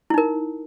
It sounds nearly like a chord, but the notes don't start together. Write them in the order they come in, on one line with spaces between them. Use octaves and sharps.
E4 D#4 A#4